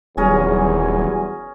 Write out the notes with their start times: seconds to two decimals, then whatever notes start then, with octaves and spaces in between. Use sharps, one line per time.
0.17 D#1 E2 F#3 G3 C#4 G#4 A#4 G#5